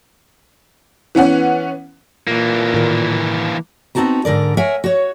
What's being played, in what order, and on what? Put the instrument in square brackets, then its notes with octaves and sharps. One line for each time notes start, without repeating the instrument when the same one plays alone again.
[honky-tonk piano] E3 B3 C#4 F#5
[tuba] A#2 [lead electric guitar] E3 A#3
[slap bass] A2 D#3
[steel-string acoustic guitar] B3 C4 D#4 F#4 A5 A#5
G#2 D3 A#4 D5
A#4 C#5 E5 F#5 G#5
F#4 C#5